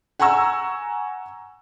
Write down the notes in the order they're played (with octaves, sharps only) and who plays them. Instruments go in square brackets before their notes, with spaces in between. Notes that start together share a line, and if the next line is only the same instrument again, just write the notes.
[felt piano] F#5 G#5 A#5 C#6 E6